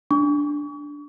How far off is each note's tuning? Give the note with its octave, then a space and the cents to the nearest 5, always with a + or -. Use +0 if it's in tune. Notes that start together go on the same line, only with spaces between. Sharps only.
D4 +0 C#6 +35